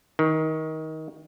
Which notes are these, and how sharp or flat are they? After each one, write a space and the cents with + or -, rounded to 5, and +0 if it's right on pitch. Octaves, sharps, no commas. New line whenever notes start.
D#3 +20